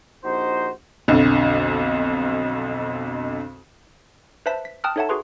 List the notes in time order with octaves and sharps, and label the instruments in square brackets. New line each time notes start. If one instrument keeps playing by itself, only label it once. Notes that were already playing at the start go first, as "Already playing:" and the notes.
[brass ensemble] A#1 D#4 F#4 C5
[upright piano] B1 F2 D3
[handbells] B4 C5 E5 A5 B6
B6
G5 A5 D#6 F6 F#6
D#4 A4 C#5 E5 F#5 A5
F#4 G#4 B4 C6